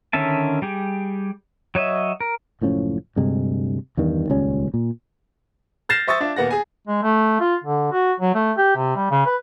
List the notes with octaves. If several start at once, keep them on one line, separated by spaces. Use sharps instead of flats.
D3 D#3 C#4 E5 A5
G3 G4 G#4
F#3 C#5 D#5 E5
A#4
F#1 A2 F3 C#4
D2 G2 C3 G#3
E2 G2 D#3
D#1 C#2 G3 C#4
A#2
F6 G6 A6 A#6 C7 E7
C5 E5 C#6 D#6 E6 A6
D4 F4 E5
D#1 A#3 B3 F#5 A#6
G#4 G#5
G#3
A3
F4
D3
F#4
F#3
A3
G4
C3
G3
C#3
B4